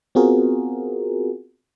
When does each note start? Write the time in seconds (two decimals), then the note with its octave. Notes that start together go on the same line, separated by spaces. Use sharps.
0.15 B3 C4 F4 F#4 G#4 A#4